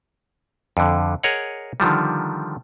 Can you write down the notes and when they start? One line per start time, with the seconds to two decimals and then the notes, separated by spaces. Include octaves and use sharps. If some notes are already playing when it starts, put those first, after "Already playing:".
0.77 F2 D3
1.23 G#4 A#4 C#5 D#5 F#5
1.80 D3 D#3 F3 G3